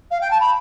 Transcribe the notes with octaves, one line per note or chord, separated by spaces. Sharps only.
F5
G5
A5
B5